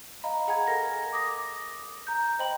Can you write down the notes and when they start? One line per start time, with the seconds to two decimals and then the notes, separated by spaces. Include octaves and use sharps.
0.24 D#5 F5 A#5 B5
0.48 G#4 F#5 G#5 A#5 G#6
0.67 A4 A#4 A#6
1.13 D6 D#6 A#6
2.07 A#5 G6
2.39 C5 D#5 G5 B5 F#7